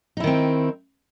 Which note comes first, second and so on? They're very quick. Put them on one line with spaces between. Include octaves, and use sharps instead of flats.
D#4 E4 D#3 C4